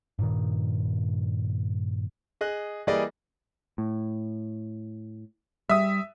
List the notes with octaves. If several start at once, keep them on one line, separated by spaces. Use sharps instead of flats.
G2 A#2 D#3
G#4 D#5 F#6
E3 G3 A#3 G#4 D5 D#5
A2
G3 E5 D#6